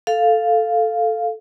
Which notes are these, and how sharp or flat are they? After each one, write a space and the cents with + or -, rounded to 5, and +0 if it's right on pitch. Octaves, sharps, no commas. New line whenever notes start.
A4 +0 F5 +0